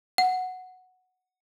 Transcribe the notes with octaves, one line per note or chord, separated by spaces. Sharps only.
F#5